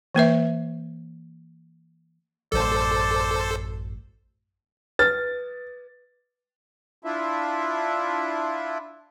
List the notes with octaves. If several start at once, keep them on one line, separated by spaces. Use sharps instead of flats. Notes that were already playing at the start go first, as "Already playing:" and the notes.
E3 A#3 B4 E5
A1 F#2 A4 C5 D5
B4 A6
D4 E4 F4 E5